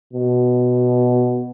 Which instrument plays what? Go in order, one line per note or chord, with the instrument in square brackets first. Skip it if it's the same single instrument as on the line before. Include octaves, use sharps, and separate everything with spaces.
[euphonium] B2